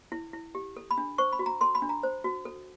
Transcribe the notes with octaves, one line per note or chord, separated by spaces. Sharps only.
E4
E4
G4
A4
B5
D4
C5 C#6
B5
F#4
A#5
A4 C6
B5
D4
A#5
C5
F#4
A4